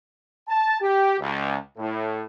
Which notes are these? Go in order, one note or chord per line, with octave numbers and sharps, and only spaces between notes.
A5
G4
C#2
A2